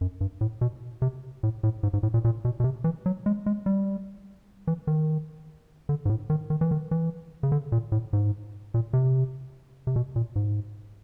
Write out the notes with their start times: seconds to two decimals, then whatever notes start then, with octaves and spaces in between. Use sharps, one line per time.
0.01 F#2
0.21 G2
0.41 A2
0.61 B2
1.02 C3
1.43 A2
1.63 A2
1.83 G#2
1.93 G#2
2.03 A2
2.14 A#2
2.25 A#2
2.45 B2
2.60 B2
2.64 C3
2.84 E3
3.06 F#3
3.26 G#3
3.46 G#3
3.66 G3
4.67 E3
4.87 D#3
5.89 D3
6.05 G#2
6.09 A2
6.30 D#3
6.50 D#3
6.61 E3
6.71 D#3
6.91 E3
7.43 C#3
7.52 D3
7.72 A#2
7.92 A2
8.13 G#2
8.74 A#2
8.93 C3
9.87 C3
9.96 B2
10.16 A#2
10.36 G#2